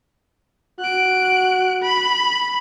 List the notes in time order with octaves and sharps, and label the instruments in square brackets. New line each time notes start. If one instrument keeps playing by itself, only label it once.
[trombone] F#4 [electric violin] F#6 D7
[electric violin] B5